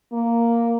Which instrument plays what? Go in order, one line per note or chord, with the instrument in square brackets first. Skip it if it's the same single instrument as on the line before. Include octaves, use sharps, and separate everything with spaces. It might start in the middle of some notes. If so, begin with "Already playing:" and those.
[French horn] A#3